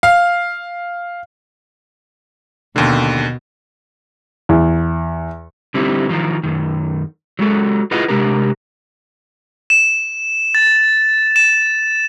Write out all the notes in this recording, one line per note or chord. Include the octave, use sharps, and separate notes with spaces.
F5
D#2 B2 D3
E2
D3 G3 C4 D#4 E4
D#3 F3 F#3
F#2 D#3
F#3 G#3 F#4 A4
E4 F4 G#4 B4 D#5 F#5
C3 G#3 D4 G4 A#4
E7
A6
E7